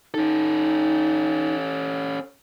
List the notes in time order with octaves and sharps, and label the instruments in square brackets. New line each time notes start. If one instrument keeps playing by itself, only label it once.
[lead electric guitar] C#4 A4 [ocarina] D#4